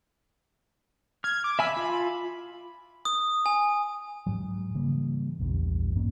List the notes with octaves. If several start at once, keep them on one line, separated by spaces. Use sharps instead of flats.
F6 G#6
D6
E5 G#5 B5 E6
F4
D#6
G#5
G#2 F#3
C#3 E3 G3 A#3
A#1 E2 G2
G2 A#3 C#4